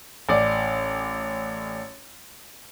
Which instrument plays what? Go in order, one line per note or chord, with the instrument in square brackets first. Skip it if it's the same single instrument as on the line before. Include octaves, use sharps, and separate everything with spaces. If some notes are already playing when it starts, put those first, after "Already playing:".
[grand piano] A1 D5